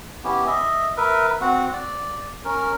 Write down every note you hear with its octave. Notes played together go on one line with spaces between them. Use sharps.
B3 C#4 E4 G4
D#5 E5
A#4 B4 E5
C4 F#4 F#5
D5
C#4 A#4